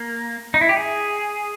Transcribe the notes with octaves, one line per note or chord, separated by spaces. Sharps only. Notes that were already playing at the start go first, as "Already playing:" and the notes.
Already playing: A#3
D#4
E4
G4
G#4